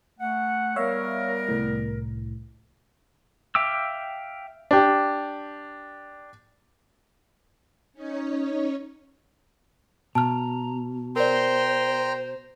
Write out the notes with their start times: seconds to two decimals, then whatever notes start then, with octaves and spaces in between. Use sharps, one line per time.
0.20 A3 F#5
0.76 G3 B3 A#4 C#5 E5 F5
1.49 C2 A2
3.55 E5 F5 G5 D6 E6
4.71 D4 G4
7.94 C#4 D#4 C#5
10.15 B2 A5 A#5 F6
11.16 A#4 C5 D5 G5 A#5 C6